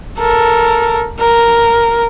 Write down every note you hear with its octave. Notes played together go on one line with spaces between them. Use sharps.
A4 A#4
A#4